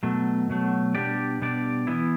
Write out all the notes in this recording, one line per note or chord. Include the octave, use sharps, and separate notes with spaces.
B2 F#3 A3
B2 F#3 A3
B2 G3 D4 G4 D5
B2 G3 D4 G4 D5
E3 B3 E4